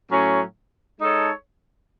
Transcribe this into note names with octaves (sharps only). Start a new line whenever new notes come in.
A2 F#3 C#4
G#3 D#4 A4 C#5